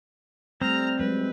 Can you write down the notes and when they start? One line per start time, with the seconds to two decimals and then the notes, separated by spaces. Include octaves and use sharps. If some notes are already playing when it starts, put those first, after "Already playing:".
0.62 G3 A3 C4 A#5 F6
1.00 F#3 G#3 B4